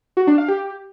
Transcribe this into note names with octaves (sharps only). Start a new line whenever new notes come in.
F#4
D4
F5
G4